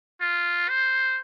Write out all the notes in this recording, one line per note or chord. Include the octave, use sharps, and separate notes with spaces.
F4
C5